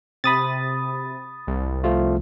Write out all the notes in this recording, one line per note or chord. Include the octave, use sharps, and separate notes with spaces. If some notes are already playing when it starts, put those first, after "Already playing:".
C3 B5 D#6 A6
C2
F3 A3 F4